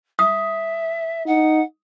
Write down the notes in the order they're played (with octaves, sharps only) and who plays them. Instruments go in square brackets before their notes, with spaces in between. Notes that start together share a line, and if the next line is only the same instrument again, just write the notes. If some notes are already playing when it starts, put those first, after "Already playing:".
[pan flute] E5 [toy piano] D#6
[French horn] D#4 [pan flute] F#5